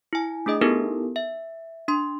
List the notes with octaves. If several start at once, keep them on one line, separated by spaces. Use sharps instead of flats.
E4 G#5
A3 D4 G#4 D#5 D#6
B3 D#4 E4 G4 A4 A#4
E5
D4 C6